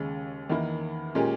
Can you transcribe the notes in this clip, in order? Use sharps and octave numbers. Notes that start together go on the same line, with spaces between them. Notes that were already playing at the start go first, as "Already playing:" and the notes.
Already playing: D#2 C#3 G#3
E2 D#3 A#3 E4
A#2 G#3 C#4 G4 A#4